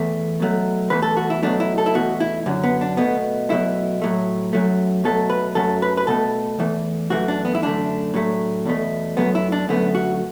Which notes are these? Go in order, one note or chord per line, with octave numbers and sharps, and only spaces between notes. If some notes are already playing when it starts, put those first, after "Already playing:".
Already playing: E2 E3 A3
B2 F#3 A3
E2 E3 A3 B4
A4
F#4
E4
B2 F#3 A3 D4
E4
A4
E4
E2 B2 A3 F#4
E4
F#2 D3 F#3
B3
D4
B2 A3 B3
B2 F#3 A3 E4
A2 F#3 A3
F#2 F#3 A3
B2 F#3 A3 A4
B4
F#2 F#3 A3 A4
B4
B4
B2 A3 A4
E2 E3 A3
F#2 E3 A3 F#4
D4
B3
E4
F#2 D3 A3 D4
A2 F#3 A3
E2 B2 A3
F#2 F#3 A3 B3
E4
D4
F#2 D3 A3 B3
F#4